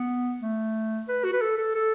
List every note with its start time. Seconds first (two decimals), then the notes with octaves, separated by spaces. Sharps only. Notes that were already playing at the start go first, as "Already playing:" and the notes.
Already playing: B3
0.41 A3
1.08 B4
1.24 F#4
1.33 B4
1.41 A4
1.58 A4
1.75 A4